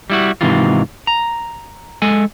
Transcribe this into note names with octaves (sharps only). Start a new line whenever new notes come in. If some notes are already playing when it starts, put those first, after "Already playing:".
G3 E4 F#4
G#2 C3 D#3 E3 F4
A#5
G#3 A4 G#5